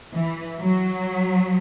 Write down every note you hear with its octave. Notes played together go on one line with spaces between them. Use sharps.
E3
F#3